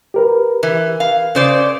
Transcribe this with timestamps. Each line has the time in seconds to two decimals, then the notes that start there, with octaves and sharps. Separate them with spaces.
0.14 G4 A#4 B4
0.63 E3
1.00 F5
1.35 C#3 C5 D5